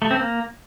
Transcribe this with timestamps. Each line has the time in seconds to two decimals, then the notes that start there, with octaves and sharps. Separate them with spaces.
0.02 A3
0.11 C4
0.20 A#3